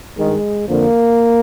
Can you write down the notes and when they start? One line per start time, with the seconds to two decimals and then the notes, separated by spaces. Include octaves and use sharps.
0.18 G2 D#3 G#3
0.68 F2 D3 F3 A#3